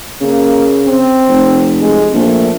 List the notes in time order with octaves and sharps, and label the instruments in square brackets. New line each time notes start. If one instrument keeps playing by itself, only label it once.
[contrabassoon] C#3 [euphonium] A#3
[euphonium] C4
[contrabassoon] F1
[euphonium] G#3
[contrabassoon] A#1 [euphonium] A3